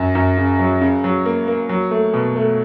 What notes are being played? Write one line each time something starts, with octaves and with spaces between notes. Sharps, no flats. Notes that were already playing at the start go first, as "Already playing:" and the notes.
Already playing: F#2
F#2
C#3
F#3
C#3
F#3
A#3
A#3
F#3
A3
B2
A3